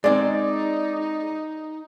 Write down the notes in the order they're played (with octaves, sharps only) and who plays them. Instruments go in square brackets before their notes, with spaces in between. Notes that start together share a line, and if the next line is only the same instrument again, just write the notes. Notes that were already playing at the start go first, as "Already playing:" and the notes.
[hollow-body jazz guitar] G#3 C4 [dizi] D#4 [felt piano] D5